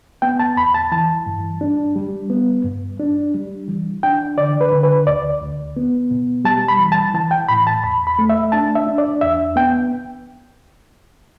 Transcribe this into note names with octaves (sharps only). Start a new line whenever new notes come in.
B3 G5
A5
E2 B5
A5
E3 A5
G2
D4
G3
B3
G2
D4
G3
E3
D4 G5
D3 D5
B4
D3
B4
D2 D5
D2
B3
B2
G3 A5
B5
E3
A5
E3 A5
G5
A2 B5
A5
E2 B5
B5
A3
E5
D4 A5
E5
D4
D5
E2 E5
B3 G5